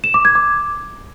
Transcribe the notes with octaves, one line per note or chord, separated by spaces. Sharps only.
E7
D6
G#6
D6